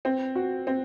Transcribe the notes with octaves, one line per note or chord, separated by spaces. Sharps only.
C4
F#4
C4